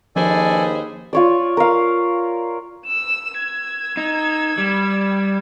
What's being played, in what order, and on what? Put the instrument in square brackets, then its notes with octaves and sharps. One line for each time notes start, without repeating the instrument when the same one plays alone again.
[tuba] D#2 [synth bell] F3 [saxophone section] G#4 B4 C5 [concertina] A4 D5 G#5
[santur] F4 C#5 D5
A#4 F5
[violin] E6 E7
E6 G#6
[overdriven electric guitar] D#4
G3